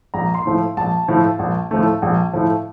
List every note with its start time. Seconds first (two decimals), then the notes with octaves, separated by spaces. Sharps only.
0.14 A#1 A#5
0.35 C6
0.46 A2 F3 A3
0.77 A#1 A5
1.08 A2 F3 A3
1.39 A#1
1.71 A2 F3 A3
2.02 A#1
2.33 A2 F3 A3